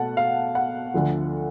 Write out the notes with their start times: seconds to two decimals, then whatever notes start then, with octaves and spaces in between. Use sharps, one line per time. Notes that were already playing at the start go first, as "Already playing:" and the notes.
Already playing: B2 A3 F#5 A5
0.17 F5
0.55 F#5
0.94 D2 D3 F3